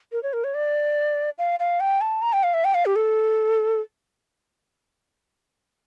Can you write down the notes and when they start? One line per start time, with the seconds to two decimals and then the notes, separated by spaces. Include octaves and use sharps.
0.12 A#4
0.23 C#5
0.33 A#4
0.44 C#5
0.54 D5
1.38 F5
1.60 F5
1.80 G5
2.01 A5
2.22 A#5
2.33 G5
2.43 F5
2.54 E5
2.65 G5
2.74 F5
2.86 G4
2.96 A4